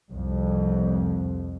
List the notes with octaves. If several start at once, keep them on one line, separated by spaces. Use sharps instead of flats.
C2 F2